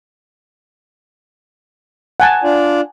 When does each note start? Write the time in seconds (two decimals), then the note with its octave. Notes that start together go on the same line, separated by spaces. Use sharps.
2.20 F#5 G#5 A5
2.44 D4 F4 D5